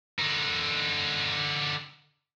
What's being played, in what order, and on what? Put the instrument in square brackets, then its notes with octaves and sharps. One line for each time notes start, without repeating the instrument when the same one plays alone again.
[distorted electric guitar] D3 D#4